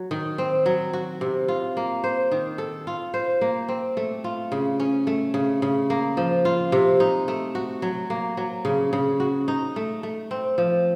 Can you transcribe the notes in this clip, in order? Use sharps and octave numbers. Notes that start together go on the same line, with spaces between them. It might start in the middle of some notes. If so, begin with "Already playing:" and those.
Already playing: F#3
D#3
C4
F#3
F#4
C3
F4
A#3
C5
D#3
A4
F4
C5
A#3
C4
A3
F4
C#3
C#4
A3
C#3
C#3
A#3
F3
F4
C3
D#4
A3
F#4
F#3
A#3
F#3
C#3
C#3
F#4
D#4
A3
A3
C4
F3